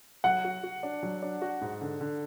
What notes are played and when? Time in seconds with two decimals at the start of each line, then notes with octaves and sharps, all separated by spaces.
0.24 F#3 F#5
0.44 F#4
0.63 F#4
0.83 D4
1.03 F#3
1.22 D4
1.42 F#4
1.61 G#2
1.81 D3
2.01 D3